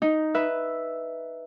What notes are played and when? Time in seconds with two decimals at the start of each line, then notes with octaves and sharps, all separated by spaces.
0.02 D#4
0.34 B4 E5